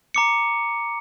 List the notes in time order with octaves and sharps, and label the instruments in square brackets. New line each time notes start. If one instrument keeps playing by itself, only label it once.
[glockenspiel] A#5 D6 C#7